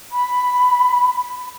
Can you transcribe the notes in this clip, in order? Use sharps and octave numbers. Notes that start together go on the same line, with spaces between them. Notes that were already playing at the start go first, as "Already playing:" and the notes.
B5